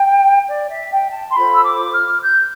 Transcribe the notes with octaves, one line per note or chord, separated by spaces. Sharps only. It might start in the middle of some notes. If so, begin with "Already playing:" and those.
Already playing: G5
D5
E5
G5
A5
C6
F4 A4 C5 B5
E6
D6
F6
G6